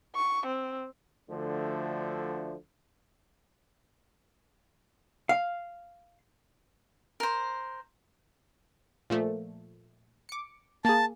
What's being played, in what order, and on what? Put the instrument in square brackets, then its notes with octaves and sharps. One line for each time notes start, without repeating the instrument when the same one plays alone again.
[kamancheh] C#6
C4
[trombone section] D2 D3 F3 A3
[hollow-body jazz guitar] F5
[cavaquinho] A#4 C5
[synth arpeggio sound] A#2 F3 A3
D6 C#7
[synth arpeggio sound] A#3 G#4 [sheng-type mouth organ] A5